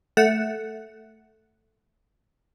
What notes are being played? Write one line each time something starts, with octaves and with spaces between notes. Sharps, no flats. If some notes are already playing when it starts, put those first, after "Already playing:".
A3 F#5